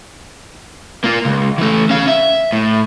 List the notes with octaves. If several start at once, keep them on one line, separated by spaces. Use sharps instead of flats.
A#3 F4
C#2
E3 A3
C#4 F5
E5
A2